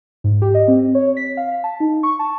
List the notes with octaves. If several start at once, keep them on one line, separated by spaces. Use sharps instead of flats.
G#2
G4
D#5
C4
C#5
B6
F5
A5
D#4
C#6
A5